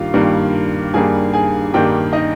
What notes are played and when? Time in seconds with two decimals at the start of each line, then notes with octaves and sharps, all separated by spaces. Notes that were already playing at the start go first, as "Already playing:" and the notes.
Already playing: G2 D#3 G3 A#3 F4 F5
0.14 G2 D#3 G3 A#3
0.94 G2 D#3 G3 A#3 G#4 G#5
1.33 G#4 G#5
1.74 G2 D#3 G3 A#3 G4 G5
2.13 D#4 D#5